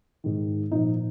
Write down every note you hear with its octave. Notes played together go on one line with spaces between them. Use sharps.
G#2 D#3
A#2 F3 D#4